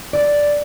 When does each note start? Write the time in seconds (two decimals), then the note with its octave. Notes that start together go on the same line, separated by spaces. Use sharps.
0.13 D5